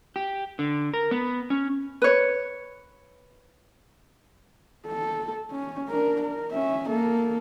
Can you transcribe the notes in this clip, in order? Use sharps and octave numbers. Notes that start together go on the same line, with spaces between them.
G4
D3
A#4
B3
C#4
B4 C#5
A4
C#4
D4 A#4
A#4
C#4 E5
A#3 A4